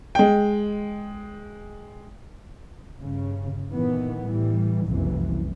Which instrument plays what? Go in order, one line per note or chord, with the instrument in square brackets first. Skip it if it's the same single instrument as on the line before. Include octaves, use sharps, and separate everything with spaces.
[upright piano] G#3 G5
[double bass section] G2 C#3
A#2 D#3 E3 B3
A2 E3 G3
F#1 C2 F2 C3 E3